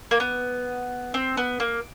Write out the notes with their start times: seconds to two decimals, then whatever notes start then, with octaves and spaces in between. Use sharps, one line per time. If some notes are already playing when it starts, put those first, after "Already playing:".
0.11 A#3
0.20 B3
1.14 C4
1.37 B3
1.60 A#3